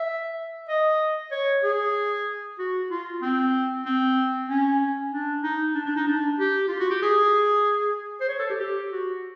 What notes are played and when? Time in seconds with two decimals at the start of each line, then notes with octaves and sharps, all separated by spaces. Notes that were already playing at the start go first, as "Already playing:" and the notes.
Already playing: E5
0.69 D#5
1.32 C#5
1.64 G#4
2.59 F#4
2.90 F4
3.22 C4
3.85 C4
4.49 C#4
5.12 D4
5.43 D#4
5.75 D4
5.86 D4
5.96 D#4
6.07 D4
6.39 G4
6.68 F4
6.80 F#4
6.90 G4
7.02 G#4
8.21 C5
8.29 C#5
8.39 A4
8.50 G4
8.60 G4
8.92 F#4